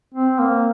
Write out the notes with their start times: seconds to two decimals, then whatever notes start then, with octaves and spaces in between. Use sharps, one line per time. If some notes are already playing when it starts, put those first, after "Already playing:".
0.15 C4
0.39 A#3